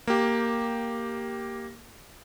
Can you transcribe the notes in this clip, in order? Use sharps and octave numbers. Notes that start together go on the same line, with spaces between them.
A#3 G4